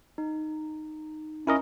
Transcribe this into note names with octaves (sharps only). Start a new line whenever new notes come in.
D#4
C#4 E4 A#4 D#5